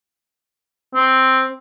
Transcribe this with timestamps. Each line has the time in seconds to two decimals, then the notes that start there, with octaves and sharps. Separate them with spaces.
0.95 C4